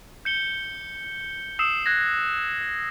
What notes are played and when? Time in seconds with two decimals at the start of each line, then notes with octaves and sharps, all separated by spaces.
0.25 G6 C#7 G7
1.59 D#6 E6 C7 E7
1.86 F#6 G#6 A#6